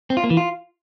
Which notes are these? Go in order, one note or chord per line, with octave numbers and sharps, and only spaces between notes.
C4
F4
A#3
E3
F4